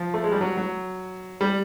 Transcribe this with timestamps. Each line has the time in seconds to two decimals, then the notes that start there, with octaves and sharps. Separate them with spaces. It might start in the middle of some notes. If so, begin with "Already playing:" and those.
Already playing: F3
0.14 A3
0.24 G#3
0.32 G3
0.41 F#3
0.57 F#3
1.41 G3